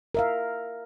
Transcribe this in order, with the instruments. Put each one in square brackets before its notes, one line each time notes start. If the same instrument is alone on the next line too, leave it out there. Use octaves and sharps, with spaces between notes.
[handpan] A#4 E5 F5